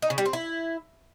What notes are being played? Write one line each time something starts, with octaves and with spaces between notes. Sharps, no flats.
D#4
C#3
G3
C4
E4